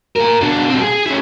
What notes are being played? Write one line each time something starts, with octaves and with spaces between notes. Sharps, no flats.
A#2 A#4
B2 D4
B2 C4
G#4 G#5
C#4 E4